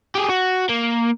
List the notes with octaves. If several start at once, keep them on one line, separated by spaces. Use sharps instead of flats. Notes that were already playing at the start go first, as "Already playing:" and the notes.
G4 G#4
F#4
A#3